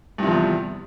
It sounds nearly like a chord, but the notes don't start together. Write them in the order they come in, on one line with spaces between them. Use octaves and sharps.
G2 C3 F3 E2